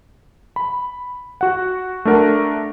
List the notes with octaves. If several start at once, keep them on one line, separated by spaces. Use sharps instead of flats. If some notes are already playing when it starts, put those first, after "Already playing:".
B5
F#4 F#5
A3 D4 A#4 F#5